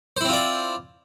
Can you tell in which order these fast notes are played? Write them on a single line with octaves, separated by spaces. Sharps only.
C5 E4 C4 F4 D5